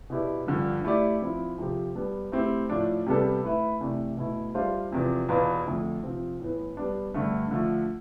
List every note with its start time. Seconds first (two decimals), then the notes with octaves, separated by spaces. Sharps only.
0.10 B2 B3 E4 G4 D5
0.47 G2 D3 F3
0.84 A3 E4 G4 D5
1.22 F3 C4 E4
1.58 F2 C3 F3 C4 G4
1.95 G3 B3 D4
2.32 A3 C4 E4 G4
2.70 A2 F3 A3 D4
3.06 C3 G3 B3 D4 A4
3.44 A3 E4 B4 E5
3.80 C3 E3 A3 D4
4.17 B2 A3 E4
4.55 G3 D4 F4 C5 E5
4.91 E2 C3 F3
5.29 E2 B2 B3 F4 B4
5.65 F2 D3 A3
6.02 C3 F3 C4
6.40 A2 E3 B3
6.77 G3 B3 D4
7.14 G2 D3 A3
7.51 D3 F3 A3